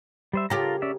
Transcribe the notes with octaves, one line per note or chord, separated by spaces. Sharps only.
G3 C5 E5
C#3 F4 G4 A4 A#4 A#5
C#4 D5 E5